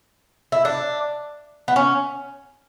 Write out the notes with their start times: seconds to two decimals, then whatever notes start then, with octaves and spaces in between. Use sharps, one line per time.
0.52 E4
0.65 D4
1.68 B3
1.76 C#4